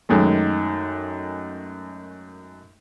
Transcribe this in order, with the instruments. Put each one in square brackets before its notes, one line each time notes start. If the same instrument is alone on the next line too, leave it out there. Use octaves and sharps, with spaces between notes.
[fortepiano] F#2 D#3 G#3 A3